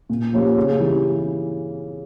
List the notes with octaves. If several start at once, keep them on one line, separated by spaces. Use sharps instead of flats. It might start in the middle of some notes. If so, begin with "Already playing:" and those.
A#2
F3 A#3 C#4 G4
C#3
E3 G3